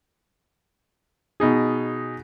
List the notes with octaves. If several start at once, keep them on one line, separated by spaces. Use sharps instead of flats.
B2 D#4 G#4